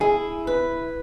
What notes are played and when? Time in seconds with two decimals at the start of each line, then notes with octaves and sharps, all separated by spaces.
0.01 E4 G#4
0.47 B4